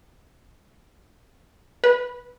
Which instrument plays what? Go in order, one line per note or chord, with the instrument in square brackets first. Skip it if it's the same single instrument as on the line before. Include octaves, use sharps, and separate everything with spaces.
[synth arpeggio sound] B4